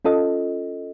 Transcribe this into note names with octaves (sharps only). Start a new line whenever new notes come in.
C#4 F4 A4 D#5